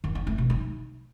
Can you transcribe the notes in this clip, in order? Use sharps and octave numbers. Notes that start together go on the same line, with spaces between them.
D#3
D#4
A3
B2
D#4